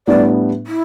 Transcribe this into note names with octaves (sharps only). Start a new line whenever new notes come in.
A2 G3 B3 D4 D5
E4